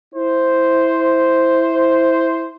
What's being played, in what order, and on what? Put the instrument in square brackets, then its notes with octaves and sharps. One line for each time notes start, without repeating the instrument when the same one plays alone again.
[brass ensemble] E4 C5